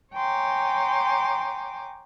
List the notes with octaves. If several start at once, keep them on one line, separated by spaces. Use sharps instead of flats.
C#5 G5 G#5 A#5 C6 D6